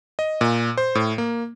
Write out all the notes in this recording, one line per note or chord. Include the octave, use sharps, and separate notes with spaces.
D#5
A#2
C5
A2
A#3